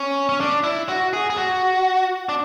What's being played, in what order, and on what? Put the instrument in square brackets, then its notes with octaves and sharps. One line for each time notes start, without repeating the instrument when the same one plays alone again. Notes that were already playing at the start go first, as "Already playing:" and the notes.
Already playing: [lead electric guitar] C#4
C#4
D4
E4
F#4
G#4
G#4
F#4
D4